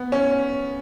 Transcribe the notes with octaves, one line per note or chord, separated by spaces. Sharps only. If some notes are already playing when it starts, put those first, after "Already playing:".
Already playing: B3
C#4